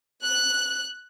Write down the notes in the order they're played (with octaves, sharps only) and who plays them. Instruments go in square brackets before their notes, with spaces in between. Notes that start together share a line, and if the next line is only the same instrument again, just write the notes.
[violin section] F#6